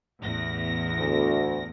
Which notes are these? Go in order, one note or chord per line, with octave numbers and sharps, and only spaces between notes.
A1 E2 A#6
D2